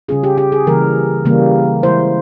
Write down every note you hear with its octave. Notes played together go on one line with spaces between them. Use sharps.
C#3 G3 C#4 F4 G#4
G4
G4
G#4
C#3 E3 G3 A#3 A#4
C#3 E3 G3 A#3
E3 G#3 E4 C5